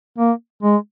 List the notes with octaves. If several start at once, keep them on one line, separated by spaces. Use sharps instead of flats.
A#3
G#3